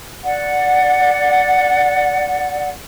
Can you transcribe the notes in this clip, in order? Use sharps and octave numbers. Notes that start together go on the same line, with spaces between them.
D5 F#5